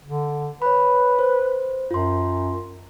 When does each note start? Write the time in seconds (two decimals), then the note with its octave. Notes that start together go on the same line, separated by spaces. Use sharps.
0.05 D3
0.62 B4 C#5 B5
1.19 C5
1.91 F#2 F4 C6